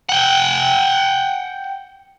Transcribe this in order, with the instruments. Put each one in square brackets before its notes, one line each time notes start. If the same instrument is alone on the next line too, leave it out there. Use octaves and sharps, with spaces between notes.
[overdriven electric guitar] F#5 G5